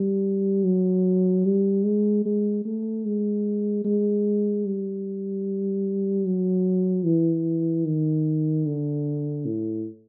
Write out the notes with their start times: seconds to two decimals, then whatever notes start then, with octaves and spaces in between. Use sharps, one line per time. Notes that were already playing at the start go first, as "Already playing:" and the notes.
Already playing: G3
0.64 F#3
1.45 G3
1.85 G#3
2.25 G#3
2.65 A3
3.05 G#3
3.84 G#3
4.66 G3
6.25 F#3
7.05 E3
7.85 D#3
8.66 D3
9.46 A2